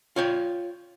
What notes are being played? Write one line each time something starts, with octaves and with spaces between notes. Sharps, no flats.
F4 C#5 G5